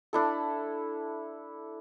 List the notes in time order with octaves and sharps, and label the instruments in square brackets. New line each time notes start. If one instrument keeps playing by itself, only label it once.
[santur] D4 E4 A4